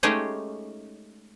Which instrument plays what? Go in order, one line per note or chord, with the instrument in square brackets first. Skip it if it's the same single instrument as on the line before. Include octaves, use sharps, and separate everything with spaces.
[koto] G#3 A3 C#4 D#4 G4 G#4